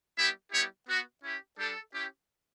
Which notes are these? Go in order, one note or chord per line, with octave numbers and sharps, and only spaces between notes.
G3 B3 E4 G4 E5
G3 B3 E4 G4 C#5
B3 F#4
C#4 E4 G4
G3 D4 G4 A4
C#4 E4 G4